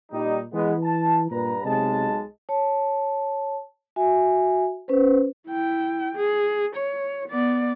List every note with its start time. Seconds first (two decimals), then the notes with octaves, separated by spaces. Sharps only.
0.12 A#2 G3 D#4
0.54 E3 G#3 B3
0.83 A5
1.31 G2 A#2 B4 A#5
1.65 B1 C3 G#3 A5
2.49 C#5 A5
3.96 F#4 E5 G#5
4.88 C#4 B4 C5
5.48 E4 G5
6.16 G#4
6.75 C#5
7.28 B3 D5